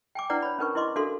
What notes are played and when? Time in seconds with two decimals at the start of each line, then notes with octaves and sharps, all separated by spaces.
0.15 G5 G#5 D6
0.30 D4 E4 B4 D5 F#5 A#5
0.42 C#5 B5
0.59 C#4 D#4 A#4 B4 C#6
0.75 E4 B4 D#5 C6 D6
0.96 D4 F#4 A4 A#4 F5 C6